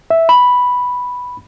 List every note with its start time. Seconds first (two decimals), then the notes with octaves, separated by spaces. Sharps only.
0.10 E5
0.29 B5